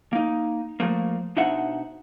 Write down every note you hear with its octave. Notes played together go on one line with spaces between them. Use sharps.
A#3 D#4
F3 A3 A#3
B2 D4 D#4 C5 E5 F#5